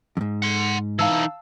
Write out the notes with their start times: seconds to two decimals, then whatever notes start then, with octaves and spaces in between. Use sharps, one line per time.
0.17 F2 G#2
0.42 F#5 C6
0.99 E3 D#4 F5 A5 E6